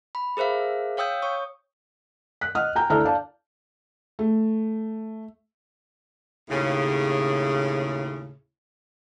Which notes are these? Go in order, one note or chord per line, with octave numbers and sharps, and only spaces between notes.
B5
G#4 A#4 C5 E5 F5
C#5 F5 G5 D#6 E6 G6
C#5 C#6 D#6
F#6 B6
D#5 F#5 D#6 F6
G5 G#5 A#5 G6
D2 E4 A4 D5 A#5 F6
D5 F5 A5
A3
D#2 A2 C#3